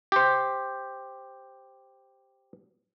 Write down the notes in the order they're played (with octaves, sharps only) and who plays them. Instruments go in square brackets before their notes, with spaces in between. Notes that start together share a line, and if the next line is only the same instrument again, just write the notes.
[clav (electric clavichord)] G4 C5